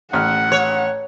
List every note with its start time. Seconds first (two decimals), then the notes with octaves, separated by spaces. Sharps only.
0.13 A1 F#5 F6
0.52 C#5